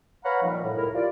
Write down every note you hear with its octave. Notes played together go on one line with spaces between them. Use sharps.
B4 C#5 F5 F#5 A#5 B5
A#2 D#3 F3 G3
A2
C#2 A2 E4 A#4
F3 F4 G4 D5